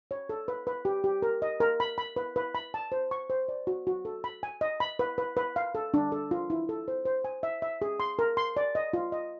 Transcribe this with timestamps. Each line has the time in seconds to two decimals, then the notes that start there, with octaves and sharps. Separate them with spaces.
0.11 C#5
0.29 A4
0.48 B4
0.67 B4
0.85 G4
1.04 G4
1.22 A#4
1.42 D#5
1.60 A#4
1.80 B5
1.98 B5
2.16 B4
2.36 B4
2.55 B5
2.74 A5
2.92 C5
3.11 C#6
3.30 C5
3.49 D5
3.67 F#4
3.87 F#4
4.05 A4
4.24 B5
4.43 G#5
4.61 D#5
4.80 B5
4.99 B4
5.18 B4
5.37 B4
5.56 F5
5.75 A4
5.94 D4
6.12 A4
6.31 F4
6.50 E4
6.69 A4
6.88 C5
7.05 C5
7.25 G#5
7.43 E5
7.62 E5
7.82 G#4
8.00 C6
8.19 A#4
8.37 C6
8.57 D5
8.75 D#5
8.93 F4
9.12 D#5